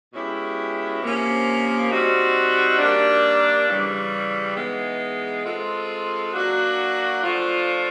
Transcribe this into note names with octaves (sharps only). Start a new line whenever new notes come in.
B2 G#3 C#4 E4 G4
C3 F3 A#3 C#4
G3 C4 D#4 F#4
D#3 G3 A#3 D4
C#3 E3 G3
E3 G#3 B3 D#4 G#4
G#3 C4 F4 A4
F#3 A#3 D4 F#4
F3 A3 D4 F4